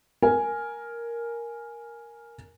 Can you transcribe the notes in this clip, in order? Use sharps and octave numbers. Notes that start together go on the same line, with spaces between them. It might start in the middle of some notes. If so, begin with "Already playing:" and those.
A#4 G#5